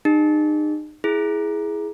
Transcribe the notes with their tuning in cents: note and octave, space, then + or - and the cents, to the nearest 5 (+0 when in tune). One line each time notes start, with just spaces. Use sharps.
D#4 -35 G#4 -40
E4 +0 G#4 +10